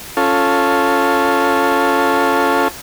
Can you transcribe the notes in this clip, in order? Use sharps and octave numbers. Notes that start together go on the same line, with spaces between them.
C#4 F4 A4